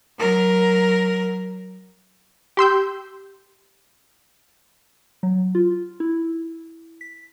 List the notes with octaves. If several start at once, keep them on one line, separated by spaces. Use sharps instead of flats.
F#3 A#4
G4 C6 E6 G6
F#3
F4
E4
B6